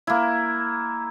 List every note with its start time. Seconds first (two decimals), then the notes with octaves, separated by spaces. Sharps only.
0.07 A#3 E4